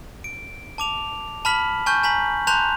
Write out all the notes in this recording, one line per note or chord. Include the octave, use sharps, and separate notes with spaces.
D7
A5 D6 F7
A5 B5 F6 B6 F#7
G#5 A5 C#6 F6 G6
G#5 A#5 B6 F#7
A5 A#5 C6 F#6 G6 F7